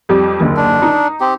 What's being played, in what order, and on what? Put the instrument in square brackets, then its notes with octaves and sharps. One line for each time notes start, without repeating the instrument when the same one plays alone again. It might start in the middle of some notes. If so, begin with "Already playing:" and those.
[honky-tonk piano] F2 G3 D6
F#1 D#2 D3
[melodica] D4
[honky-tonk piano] D#4
[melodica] C4 G4